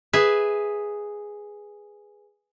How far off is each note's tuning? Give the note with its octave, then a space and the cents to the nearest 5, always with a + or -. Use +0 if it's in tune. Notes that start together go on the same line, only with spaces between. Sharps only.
G#4 +0 B4 +0 E5 +0